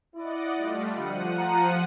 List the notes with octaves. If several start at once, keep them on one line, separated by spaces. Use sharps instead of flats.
E4 D5 D#5 F#5
G3 A3 F4
D2 F3 G3 F#5 D#7
A#5